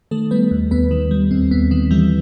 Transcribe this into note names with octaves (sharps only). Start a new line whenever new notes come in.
D#3 A3 A4
G3 B3 B4
D#2
D#2 B3 B4
D#3
G3
D#2 C4
D#2 B3
D#3 B3
E3 G3 E4